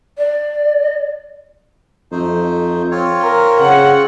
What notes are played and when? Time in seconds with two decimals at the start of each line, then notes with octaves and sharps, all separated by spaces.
0.18 D5
2.12 F2 A3 D#4 C5
2.91 C4 F4 C#5
3.21 A#4
3.61 C#3 F#5